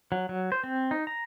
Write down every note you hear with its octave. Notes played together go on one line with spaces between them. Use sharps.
F#3
F#3
C5
C4
D#4
A#5